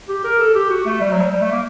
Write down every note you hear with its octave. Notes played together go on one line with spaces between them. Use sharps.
G4
A#4
A4
G4
F#4
A3
G3
F#3
G3
G3
A3
A#3